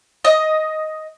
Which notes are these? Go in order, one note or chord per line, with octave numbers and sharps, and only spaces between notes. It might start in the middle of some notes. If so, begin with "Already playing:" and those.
D#5